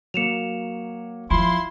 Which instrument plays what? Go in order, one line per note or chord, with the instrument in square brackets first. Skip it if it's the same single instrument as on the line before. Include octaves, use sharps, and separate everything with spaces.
[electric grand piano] F#3 A#3 [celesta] C#7 E7 F7
[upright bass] F3 [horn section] E4 F4 C6 [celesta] B5